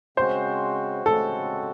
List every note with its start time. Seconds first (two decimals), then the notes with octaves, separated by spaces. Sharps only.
0.17 C#3 G#3 C4 F#4 C5
1.06 C#3 G#3 C4 F#4 A4